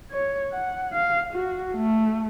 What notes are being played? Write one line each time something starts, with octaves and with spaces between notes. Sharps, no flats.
C#5
F#5
F5
F#4
A3